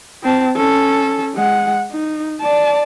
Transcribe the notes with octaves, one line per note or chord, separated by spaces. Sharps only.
C4 A5
C#4 A4
G#3 F#5
D#4
D5 A5